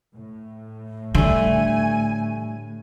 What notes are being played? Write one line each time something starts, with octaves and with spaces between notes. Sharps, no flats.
A2
D3 G3 A3 G#5